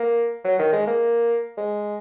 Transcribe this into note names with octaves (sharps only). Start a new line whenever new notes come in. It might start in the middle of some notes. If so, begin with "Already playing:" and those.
Already playing: A#3
F#3
D#3
G#3
A#3
G#3